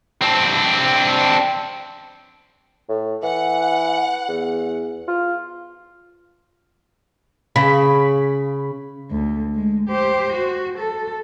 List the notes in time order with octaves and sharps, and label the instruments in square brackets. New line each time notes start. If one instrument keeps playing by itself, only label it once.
[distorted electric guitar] C4 D4
[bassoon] A2
[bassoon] E3 [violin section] F#5
[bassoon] E2
F4
[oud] C#3 [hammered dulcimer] B5
[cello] D2
G#3
G4 C5
F#4
A4